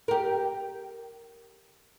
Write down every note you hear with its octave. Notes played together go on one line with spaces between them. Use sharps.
G4 A#4